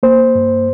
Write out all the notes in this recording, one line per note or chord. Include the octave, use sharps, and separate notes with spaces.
A#3 C5
G2